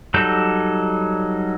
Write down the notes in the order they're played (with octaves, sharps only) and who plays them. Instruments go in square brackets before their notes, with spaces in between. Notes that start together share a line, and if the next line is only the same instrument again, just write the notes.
[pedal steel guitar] F#3 G3 D#4 A4 G6